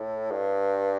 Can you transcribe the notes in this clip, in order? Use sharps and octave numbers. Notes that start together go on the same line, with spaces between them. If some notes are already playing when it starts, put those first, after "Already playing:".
Already playing: A2
G2